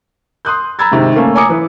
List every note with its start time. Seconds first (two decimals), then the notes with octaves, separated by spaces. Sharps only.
0.45 C6 D#6 F#6 G6
0.79 A#5 B5 E6 G#6 A6
0.92 G#2 C3 D#3
1.15 A3 A#3 C#4
1.35 C#5 G#5 A#5 D6 D#6 C#7
1.49 E3 B4